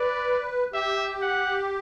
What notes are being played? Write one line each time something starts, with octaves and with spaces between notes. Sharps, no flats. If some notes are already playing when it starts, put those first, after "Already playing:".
Already playing: B4 D5
G4 E5
F#5